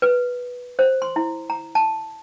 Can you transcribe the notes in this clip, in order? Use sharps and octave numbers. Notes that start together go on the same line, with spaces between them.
B4
C5
C6
E4
A#5
A5